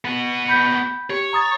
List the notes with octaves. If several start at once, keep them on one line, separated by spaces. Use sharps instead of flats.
B3 F#4
B5 G6 B6
G4 C#5
A#5 D#6 A6